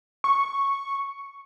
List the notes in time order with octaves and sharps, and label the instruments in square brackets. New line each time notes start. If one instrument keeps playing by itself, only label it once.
[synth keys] C#6